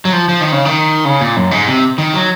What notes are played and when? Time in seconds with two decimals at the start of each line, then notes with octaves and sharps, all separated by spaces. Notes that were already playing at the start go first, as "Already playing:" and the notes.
0.05 F#3
0.13 F3
0.29 F3
0.41 D#3
0.52 C#3
0.65 D#3
1.05 C#3
1.21 A#2
1.37 F#2
1.51 G#2
1.67 C3
1.98 D#3
2.14 F#3